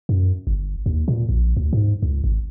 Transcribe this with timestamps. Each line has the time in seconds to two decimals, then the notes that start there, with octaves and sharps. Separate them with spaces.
0.09 F#2
0.47 G1
0.86 D#2
1.08 A#2
1.29 A#1
1.57 D2
1.73 G#2
2.02 C#2
2.24 G#1